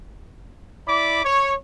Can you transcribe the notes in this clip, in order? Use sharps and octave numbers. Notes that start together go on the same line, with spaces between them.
E4 D5 B5 D6
C#5